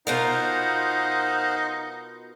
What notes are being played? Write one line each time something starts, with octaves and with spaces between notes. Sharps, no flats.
B2 D#4 F4 A#4 C5 F5 F#5